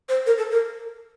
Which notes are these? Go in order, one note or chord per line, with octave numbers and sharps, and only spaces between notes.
C5
A#4
A4
A#4